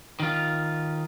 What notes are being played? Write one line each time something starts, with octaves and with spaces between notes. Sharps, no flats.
D#3 F4